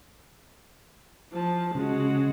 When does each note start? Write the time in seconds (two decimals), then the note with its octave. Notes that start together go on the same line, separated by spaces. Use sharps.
1.32 F3 A5
1.75 C#3 G#3 F#4